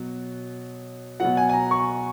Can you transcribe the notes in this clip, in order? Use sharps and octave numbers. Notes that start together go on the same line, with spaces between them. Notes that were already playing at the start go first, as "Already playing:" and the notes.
Already playing: B2 F#3
B2 F#3 F#5
G#5
G#5
A#5
C#6